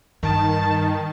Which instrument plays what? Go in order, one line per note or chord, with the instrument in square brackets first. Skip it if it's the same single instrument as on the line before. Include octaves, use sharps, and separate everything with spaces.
[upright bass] G2 [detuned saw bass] D#3 [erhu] A5